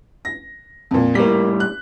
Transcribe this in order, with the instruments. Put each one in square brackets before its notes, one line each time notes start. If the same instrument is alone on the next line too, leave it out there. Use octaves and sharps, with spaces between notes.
[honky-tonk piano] A#6
F2 A#2
[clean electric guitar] A2 G3 [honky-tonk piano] A#3 B6
[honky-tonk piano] F#6